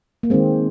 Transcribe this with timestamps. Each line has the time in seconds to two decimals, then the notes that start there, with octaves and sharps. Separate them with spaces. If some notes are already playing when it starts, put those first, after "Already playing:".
0.23 A#3
0.30 D#3 G#3 C4